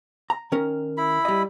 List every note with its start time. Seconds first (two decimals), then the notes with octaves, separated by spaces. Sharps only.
0.30 A#5
0.52 D#3 C#4 A#4
0.98 E4 B5
1.25 G3 D#5